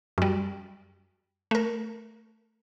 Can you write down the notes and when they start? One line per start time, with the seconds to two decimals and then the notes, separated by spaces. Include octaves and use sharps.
0.18 F#2 G3
1.51 A3 A#4